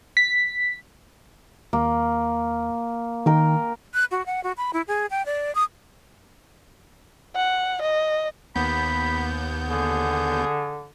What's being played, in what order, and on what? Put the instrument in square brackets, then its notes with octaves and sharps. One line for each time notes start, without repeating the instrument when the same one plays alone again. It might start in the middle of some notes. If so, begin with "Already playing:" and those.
[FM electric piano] B6
[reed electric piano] D#2 [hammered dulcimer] A#3
[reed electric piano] D#3 [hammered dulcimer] A#4 G5
[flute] F#6
F#4
F#5
F#4
B5
E4
G#4
G5
D5
D#6
[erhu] F#5
D#5
[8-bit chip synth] D#2 B3 G6 [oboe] B5
[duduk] D3 [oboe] G#4